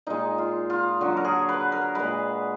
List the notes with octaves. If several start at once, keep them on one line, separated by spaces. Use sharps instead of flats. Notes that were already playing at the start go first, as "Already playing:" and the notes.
A#2 G#3 D#4
F4
F4
D3 F#3 F#4
A#4
G#4
B4
A#4
A#2 G#3 B4